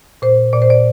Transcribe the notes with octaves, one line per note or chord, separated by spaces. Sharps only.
A#2 C5
A#2 D5
C5
D5